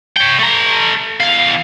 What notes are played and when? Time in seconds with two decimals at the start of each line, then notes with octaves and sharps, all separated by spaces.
0.17 C#5 G5
0.39 A3 A#5
1.20 E2 F5